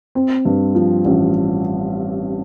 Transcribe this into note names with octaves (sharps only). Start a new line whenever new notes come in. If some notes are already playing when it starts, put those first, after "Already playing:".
C4
G2
F3
A1